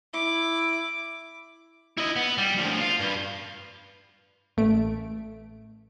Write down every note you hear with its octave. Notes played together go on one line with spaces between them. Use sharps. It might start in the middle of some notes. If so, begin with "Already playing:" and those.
E4 D6
E4 D#5
B3
G3
D2 F3
F4
G2
A1 A3 D7